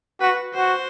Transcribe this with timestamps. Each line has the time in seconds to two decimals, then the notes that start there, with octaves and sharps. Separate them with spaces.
0.21 F#4 B4
0.54 F#4 C5